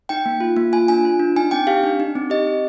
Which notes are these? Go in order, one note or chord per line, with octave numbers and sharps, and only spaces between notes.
D#4 G5
A#3
F4
A#3
F4 G#5
D4 G#5
F4
D4
D#4 G#5
C4 G5
G4 F5
D4
D#4
C4
G4 D#5
C4